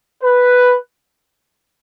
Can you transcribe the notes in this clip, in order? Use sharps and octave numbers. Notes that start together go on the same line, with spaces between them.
B4